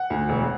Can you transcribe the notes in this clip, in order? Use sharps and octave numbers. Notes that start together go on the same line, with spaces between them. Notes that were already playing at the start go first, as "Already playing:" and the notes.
Already playing: F#5
D2
E1